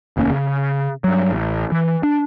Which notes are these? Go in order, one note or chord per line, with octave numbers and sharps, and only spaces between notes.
F1 D#2 A#3 C#4
C#3
G2 F#3
A1
E3
D4